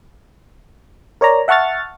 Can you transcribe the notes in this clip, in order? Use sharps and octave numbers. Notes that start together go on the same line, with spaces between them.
A#4 C#5 D5 A#5
E5 F#5 A5 C#6 F6 A6